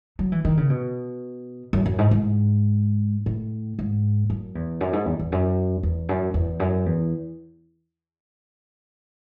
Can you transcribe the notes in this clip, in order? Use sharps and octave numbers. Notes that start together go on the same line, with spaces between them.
F#3
E3
D#3
C#3
B2
F#2
F#2
G#2
G#2
A2
G#2
F#2
E2
F#2
G#2
E2
E2
F#2
E2
F#2
E2
F#2
E2